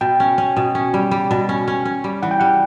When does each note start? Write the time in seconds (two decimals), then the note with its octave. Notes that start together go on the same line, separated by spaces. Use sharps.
0.01 B2 G5
0.20 C#4
0.38 C#4
0.57 B2
0.75 C#4
0.94 G3
1.11 G3
1.31 B2
1.49 C#4
1.68 C#4
1.85 C#4
2.04 G3
2.23 E3 F#5
2.31 G5
2.40 G3 F#5